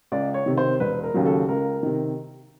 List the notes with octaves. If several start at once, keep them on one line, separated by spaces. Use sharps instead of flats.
C#2 D5
C#5
C3 D#3
C5
E1 B4
A#4
D#2 C#3 F#3
A4
C#2 A#4
C3 D#3